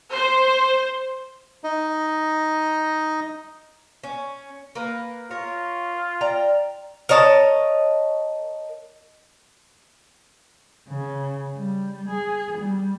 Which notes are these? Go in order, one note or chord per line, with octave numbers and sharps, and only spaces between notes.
C5
D#4 D#5
C#4
A#3 A#4 B4
F4 A#4 C#5
D5 G5 A#5
A#4 C#5 D#5 A5
C#3
G3
G#4
G3